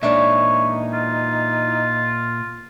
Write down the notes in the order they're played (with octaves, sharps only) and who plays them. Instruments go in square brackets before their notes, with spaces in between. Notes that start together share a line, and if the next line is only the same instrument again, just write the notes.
[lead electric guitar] A#2 E5 [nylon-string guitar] E3 G#3 D4 [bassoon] D#4 [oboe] C#5
[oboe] F4